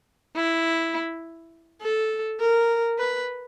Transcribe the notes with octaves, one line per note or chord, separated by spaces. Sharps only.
E4
A4
A#4
B4